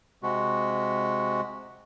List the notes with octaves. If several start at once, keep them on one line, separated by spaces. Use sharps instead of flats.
C3 G#3 F#4